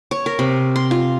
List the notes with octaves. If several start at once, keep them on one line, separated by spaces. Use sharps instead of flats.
C#5
A#4
C3
C6
F4